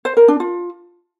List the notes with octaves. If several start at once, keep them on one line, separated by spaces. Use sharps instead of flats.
C5
A#4
D4
F4